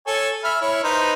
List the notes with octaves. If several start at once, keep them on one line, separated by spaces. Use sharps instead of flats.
A4 C#5 G#5
E5 B5 F6
E4 C#5
D#4 B4 C5